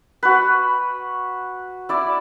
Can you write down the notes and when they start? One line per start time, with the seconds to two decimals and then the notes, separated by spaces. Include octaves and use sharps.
0.23 F#4 B4
1.89 E4 D5